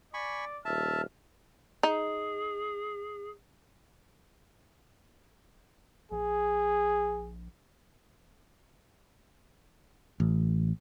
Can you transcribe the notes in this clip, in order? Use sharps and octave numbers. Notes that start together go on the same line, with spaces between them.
D5 G#5 B5 C#6
D#1 E5 A5 F6
D#4 G#4
A#1 G#4
A1